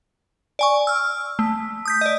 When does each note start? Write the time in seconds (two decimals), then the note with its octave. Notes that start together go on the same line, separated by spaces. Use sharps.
0.59 D5 G#5 C#6
0.87 E6 F6
1.39 A3
1.85 D#6 G6 B6
2.01 D5 D#5